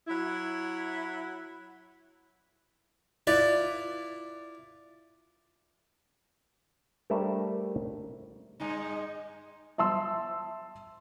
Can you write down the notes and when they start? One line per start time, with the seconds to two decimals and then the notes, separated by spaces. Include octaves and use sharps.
0.08 F#3 E4
3.27 E4 F4 B4 D5
7.10 G3 A3 D4 A#4 C5 E5
8.60 G2 G#3 D#4
9.78 E5 A5 C6 E6